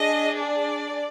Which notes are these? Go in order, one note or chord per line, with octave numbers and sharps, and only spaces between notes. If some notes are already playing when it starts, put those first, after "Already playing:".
Already playing: D4 G#4 D#5
D5